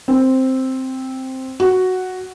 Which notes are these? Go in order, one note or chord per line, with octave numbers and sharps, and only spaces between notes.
C4
F#4